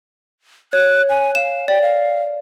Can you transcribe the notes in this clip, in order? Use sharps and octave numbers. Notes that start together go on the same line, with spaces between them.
C#5 F#6
G#5
F5 E7
D5 G5
F5